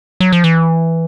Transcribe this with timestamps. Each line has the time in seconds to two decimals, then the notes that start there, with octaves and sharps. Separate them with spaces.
0.20 F#3
0.32 F3
0.44 E3